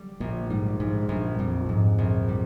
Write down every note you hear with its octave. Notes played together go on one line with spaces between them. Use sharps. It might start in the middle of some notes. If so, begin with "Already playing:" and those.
Already playing: G3
A#1 A#2
G#2 G3
A#1 G#2
A#1 G2
F2 G3
G2
F2 G#2
A#1
G3